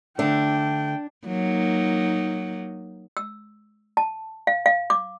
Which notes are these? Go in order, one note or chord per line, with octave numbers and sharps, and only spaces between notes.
D3 A3 D4 G5
F#3 A#3 D#4
E6
A5
F5
F5
D6